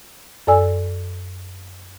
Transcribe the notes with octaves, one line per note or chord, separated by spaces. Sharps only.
F#2 A4 D5 G#5 E6